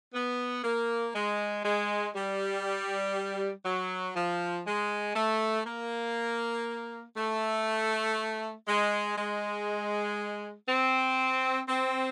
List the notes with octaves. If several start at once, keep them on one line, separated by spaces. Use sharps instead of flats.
B3
A#3
G#3
G#3
G3
F#3
F3
G#3
A3
A#3
A3
G#3
G#3
C4
C4